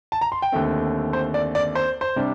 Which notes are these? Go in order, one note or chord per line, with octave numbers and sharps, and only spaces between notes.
A5
A#5
C6
G5
D#2 D3 A3 C4
C5
D5
D5
C5
C5
C3 G3 D4